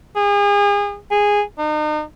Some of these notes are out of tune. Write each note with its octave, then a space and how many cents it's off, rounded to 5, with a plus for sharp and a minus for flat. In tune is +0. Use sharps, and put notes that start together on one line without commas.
G#4 -35
G#4 -10
D#4 -40